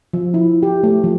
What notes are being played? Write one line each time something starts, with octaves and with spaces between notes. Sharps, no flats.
F3
E4
G4
A3
F3